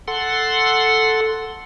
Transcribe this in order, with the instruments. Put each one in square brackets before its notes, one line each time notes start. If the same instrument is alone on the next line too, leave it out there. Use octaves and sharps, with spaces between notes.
[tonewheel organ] A4 F#5 C6